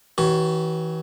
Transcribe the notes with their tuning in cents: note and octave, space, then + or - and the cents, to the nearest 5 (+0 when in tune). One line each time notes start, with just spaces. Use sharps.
E3 -30 F#4 +40 C#5 +0